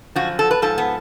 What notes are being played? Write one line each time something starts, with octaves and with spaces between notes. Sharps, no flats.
F#2 D3 F3 F#4
A4
B4
G#2 F3 A4
B3